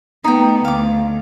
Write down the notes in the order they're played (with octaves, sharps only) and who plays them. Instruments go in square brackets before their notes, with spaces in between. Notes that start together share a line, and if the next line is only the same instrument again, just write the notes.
[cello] A3 B3 [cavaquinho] D#4 G5
[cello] D2 [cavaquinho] F5 D6